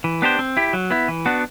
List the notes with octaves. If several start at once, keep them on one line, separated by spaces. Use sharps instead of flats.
E3
B3 D4 G4 C5
C4
E4 G4
F#3
B3 E4
E3
B3 D4 F#4